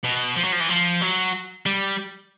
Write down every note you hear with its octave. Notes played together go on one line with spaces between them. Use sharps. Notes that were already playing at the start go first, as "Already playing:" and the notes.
B2
F3
F#3
F3
E3
F3
F#3
G3